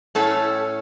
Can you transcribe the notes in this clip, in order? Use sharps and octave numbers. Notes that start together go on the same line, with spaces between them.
A2 A3 C#4 A4